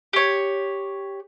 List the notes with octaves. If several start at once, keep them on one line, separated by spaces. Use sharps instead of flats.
G4 C#5